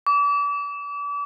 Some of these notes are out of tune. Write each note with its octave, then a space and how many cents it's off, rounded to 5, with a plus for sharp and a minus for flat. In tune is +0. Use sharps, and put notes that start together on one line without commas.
D6 -35